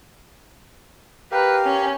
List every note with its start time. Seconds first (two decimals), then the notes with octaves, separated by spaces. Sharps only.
1.32 G4 A#4 B4 F5
1.65 C#4